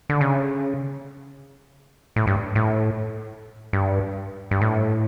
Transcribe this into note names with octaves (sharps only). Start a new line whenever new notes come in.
D3
C#3
A2
G2
A2
G2
G2
A2